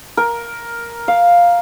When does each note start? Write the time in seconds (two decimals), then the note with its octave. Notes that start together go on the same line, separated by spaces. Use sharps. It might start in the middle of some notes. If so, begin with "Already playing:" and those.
0.17 A#4
1.08 F5